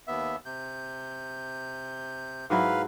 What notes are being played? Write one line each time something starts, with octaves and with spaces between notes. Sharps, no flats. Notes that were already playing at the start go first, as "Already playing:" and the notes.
D#2 B3 E5
C3 G6
G#2 F#3 E4 B4 F5